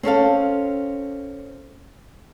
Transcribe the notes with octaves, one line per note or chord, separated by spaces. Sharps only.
C4 C#4 A4 F5